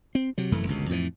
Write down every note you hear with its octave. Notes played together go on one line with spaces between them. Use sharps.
C4
C3 F#3
F1 F#2 E3 A3
G1 C#2 B2
F2 A2 D3 E3